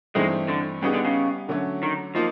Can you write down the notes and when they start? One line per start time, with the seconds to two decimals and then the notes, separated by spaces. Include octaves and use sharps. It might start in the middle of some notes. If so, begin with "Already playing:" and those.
0.15 G2 E3 G#3 A3 C4 D#4
0.48 D3
0.82 C#3 G3 B3 D#4 G#4
0.94 D3
1.05 C#3
1.49 D3 F#3 A3 C#4
1.83 D#3
2.15 F3 A#3 D#4